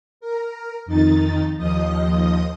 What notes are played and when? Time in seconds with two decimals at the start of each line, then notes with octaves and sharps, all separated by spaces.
0.21 A#4
0.86 F2 D#3 D#4 A6
1.57 D#2 F3 D#5 D#6